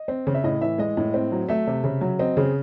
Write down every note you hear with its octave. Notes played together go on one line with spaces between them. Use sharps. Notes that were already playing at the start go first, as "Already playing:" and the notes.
Already playing: D#5
C4
C#3
E5
A2 D#5
E3 E5
G#3 D#5
A2
C4
F#3
A3 E5
C3
C#3
F#3
C4 D#5
C#3 G#4